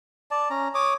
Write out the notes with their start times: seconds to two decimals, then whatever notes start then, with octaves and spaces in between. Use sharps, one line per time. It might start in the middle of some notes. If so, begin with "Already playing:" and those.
0.31 D5 A5
0.50 C#4 A#5
0.74 C#5 D6 D#6